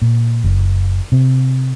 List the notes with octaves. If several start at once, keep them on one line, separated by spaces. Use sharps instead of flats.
A#2
F#1
C3